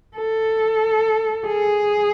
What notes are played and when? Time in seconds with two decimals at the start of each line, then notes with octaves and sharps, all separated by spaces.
0.17 A4
1.47 G#4